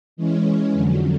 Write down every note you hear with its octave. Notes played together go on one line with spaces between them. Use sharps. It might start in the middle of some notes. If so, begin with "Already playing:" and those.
E3 G#3 C#4
F2 D3 F#3